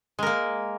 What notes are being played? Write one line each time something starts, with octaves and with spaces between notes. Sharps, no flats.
G#3 A#3 A#4